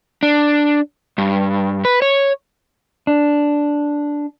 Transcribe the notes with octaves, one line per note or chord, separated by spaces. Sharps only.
D4
G2
B4
C#5
D4